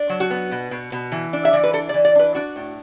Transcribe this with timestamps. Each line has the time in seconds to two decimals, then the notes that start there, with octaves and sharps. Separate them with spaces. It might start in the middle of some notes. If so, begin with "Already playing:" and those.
Already playing: D4
0.09 F#3
0.20 F#4
0.31 B3
0.51 B2
0.71 B2
0.92 B2
1.12 E3
1.33 D4
1.45 E5
1.53 E3 D5
1.64 B4
1.73 D4 A4
1.89 D5
1.94 E3
2.05 D5
2.15 D4 B4
2.35 D4 F#4
2.56 A2